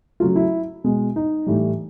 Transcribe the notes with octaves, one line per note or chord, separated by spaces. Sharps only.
C#3 F#3 A3 F4
E4
B2 G#3
D#4
A2 E3 G3